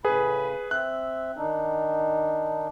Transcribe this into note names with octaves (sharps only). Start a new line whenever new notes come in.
A2 C#3 G#4 B4 B5
C4 E5 F#6
D#3 D4 D#4